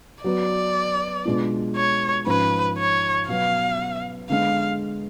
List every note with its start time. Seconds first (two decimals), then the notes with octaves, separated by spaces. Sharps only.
0.24 F#3 B3 F#4 D5
1.25 B2 G#3 D4 F4
1.76 C#5
2.27 G#2 F3 G#3 C#4 B4
2.77 C#5
3.28 B2 F#3 B3 F5
4.30 D3 G#3 B3 F5